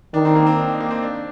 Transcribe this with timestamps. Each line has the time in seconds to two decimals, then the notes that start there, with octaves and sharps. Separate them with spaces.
0.14 D#3 D4
0.25 C4
0.35 A#3
0.47 C4
0.58 D4
0.69 D#4
0.81 A#3
0.91 C4
1.03 D4